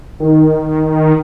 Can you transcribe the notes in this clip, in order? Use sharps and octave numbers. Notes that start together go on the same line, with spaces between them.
D#3